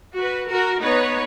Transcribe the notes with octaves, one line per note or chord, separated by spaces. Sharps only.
F#4 B4
F#4 A#4
B3 D#4 B4 C#5